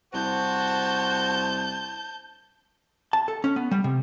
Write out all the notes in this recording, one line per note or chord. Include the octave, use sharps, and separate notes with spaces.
C2 F#4 C5 A5 G6
A5
A4
C#4
B3
G3
C3